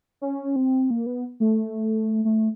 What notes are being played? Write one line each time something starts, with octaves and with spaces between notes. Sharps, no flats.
C#4
C4
A#3
B3
A3
A3